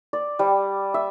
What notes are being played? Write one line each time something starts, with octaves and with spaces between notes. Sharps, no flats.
D5
G3
E5